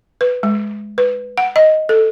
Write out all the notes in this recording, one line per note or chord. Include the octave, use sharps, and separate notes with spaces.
B4
G#3
B4
F#5
D#5
A4